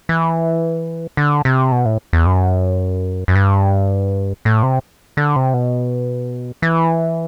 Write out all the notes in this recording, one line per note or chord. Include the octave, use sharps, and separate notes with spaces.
E3
D3
C3
B2
A2
E2
F#2
F#2
G2
A2
C3
D3
C3
B2
E3